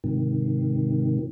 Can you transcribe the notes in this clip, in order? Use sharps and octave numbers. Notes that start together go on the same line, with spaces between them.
G#2 C3 D#3